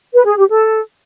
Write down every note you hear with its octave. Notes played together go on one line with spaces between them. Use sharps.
B4
G#4
G4
A4